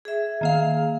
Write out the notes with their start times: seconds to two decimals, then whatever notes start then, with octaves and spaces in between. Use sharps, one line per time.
0.05 G#4 E5
0.41 D#3 A#3 F5